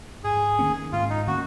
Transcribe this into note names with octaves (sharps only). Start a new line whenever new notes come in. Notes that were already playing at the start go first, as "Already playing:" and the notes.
G#2 G#4
D#3 A#3 C#4
G#2 F4
D#4
D#3 A#3 C#4 F#4